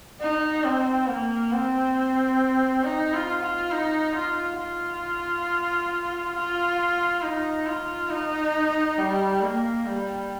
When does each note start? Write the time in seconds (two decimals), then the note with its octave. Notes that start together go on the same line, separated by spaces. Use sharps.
0.21 D#4
0.64 C4
1.08 A#3
1.52 C4
2.84 D#4
3.13 F4
3.42 F4
3.71 D#4
4.15 F4
4.59 F4
6.34 F4
7.22 D#4
7.66 F4
8.10 D#4
8.98 G3
9.41 A#3
9.86 G3